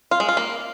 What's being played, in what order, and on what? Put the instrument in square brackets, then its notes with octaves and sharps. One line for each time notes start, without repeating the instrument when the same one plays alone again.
[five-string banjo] F4
G#3
F4
A#3